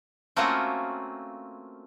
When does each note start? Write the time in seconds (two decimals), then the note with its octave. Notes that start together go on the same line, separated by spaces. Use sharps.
0.36 A3 A#3 C4 C#4 F4 F#4